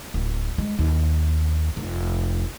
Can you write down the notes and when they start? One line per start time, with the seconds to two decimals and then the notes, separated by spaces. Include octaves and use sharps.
0.14 D1
0.58 G#3
0.79 D#2
1.77 F1